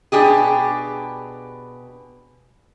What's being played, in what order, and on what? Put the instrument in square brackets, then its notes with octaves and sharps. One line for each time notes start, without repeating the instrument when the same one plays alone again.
[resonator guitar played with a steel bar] B2 D4 G4 G#4